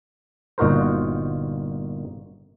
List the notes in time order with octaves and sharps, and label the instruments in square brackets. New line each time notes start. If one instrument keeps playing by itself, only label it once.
[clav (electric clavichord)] G1 A#2 D#4 F#4 A#4 C5